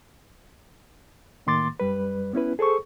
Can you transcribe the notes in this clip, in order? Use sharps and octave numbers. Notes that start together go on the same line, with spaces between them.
A2 D#3 A#3 C6 D6 A6
F#2 G3 B4
B3 C#4 E4 B4
G#4 A4 C5 C#6